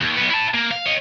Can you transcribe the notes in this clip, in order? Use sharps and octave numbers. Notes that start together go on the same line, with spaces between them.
D#2
B1 B3
E4 A5
A#3
F5
C#5 D#5